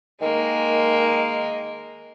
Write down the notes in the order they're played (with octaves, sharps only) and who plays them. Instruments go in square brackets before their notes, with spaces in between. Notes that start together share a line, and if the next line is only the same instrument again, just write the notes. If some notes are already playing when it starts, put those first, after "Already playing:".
[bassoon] D#3 [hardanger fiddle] G#3 A#3